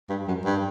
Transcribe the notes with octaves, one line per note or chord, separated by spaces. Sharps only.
G2
F#2
G2